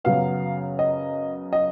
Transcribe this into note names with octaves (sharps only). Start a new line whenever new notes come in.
F#2 C#3 F#3 B3 F5
D#5
D#5